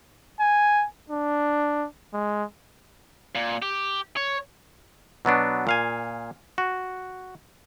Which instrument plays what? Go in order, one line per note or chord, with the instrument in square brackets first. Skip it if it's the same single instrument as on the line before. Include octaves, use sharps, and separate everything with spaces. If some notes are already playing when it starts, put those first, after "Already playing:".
[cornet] G#5
D4
G#3
[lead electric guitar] A#2
G4
C#5
[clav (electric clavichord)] B2 F#3 B3 D4
A#2 F5 G#5
F#4